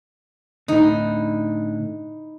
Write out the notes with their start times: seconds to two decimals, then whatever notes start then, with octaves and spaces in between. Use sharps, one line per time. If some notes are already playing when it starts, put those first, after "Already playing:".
0.68 A2 D3 D#4 E4